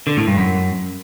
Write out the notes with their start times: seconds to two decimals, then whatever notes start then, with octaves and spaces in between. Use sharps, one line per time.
0.07 D3
0.17 A2
0.28 G2
0.38 F#2